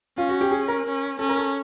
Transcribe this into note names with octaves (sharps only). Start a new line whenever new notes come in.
C#4 F4
F#4
G4
G#4
A#4
C#4
C#4 A4
A#4
A4